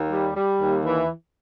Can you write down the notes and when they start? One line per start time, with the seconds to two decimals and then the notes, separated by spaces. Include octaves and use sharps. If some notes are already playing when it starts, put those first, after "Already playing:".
Already playing: D#2
0.10 G3
0.35 G3
0.60 D#2
0.85 E3